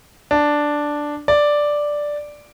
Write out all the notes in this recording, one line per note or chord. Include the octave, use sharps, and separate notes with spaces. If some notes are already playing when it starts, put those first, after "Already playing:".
D4
D5